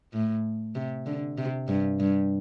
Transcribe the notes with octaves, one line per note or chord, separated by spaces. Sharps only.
A2
C3
D3
C3
G2
G2